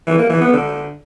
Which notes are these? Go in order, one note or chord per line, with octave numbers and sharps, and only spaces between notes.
E3
A#3
E3
B3
D3